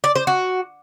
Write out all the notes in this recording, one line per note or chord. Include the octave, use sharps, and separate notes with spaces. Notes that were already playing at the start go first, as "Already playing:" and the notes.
D5
C5
F#4